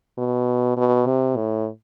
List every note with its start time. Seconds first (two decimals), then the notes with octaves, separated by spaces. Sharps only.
0.18 B2
0.77 B2
1.06 C3
1.36 A2